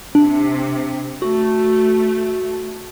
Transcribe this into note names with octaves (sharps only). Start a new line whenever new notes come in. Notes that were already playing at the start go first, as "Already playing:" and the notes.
C3 D4
A3 F#4